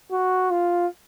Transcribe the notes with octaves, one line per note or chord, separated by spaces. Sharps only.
F#4
F4